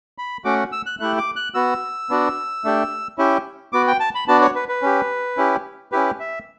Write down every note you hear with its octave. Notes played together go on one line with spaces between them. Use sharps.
B5
A3 C#4 F#4 D6
E6
F#6
A3 E4 G4 F#6
D6
F#6
B3 F#4 E6
B3 D4 F#4
A3 D4 G4
C#4 E4 G4
B3 F#4 D6
G5
A5
B5
B3 D4 F#4 A5
C#5
B4
B4
C#4 G4
C#4 E4 G4
C#4 E4 G4 B4
E5